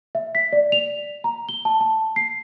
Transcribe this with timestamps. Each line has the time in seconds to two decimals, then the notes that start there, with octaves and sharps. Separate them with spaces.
0.15 E5
0.35 B6
0.53 D5
0.72 F7
1.24 A#5
1.49 G7
1.65 A5
1.81 A5
2.16 C7